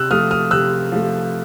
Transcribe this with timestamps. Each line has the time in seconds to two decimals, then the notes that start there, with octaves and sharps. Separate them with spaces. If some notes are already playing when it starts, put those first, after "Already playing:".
Already playing: C3 E6 F#6
0.11 F3 A3 D#6 F6
0.31 D#6 F6
0.51 C3 E6 F#6
0.92 F3 A3